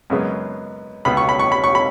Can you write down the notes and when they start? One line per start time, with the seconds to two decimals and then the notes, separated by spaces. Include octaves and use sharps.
0.10 F#2 C#3 G#3 B3
1.05 C#2 B2 B3 B5
1.17 C#6
1.29 B5
1.39 C#6
1.52 B5
1.64 C#6
1.75 B5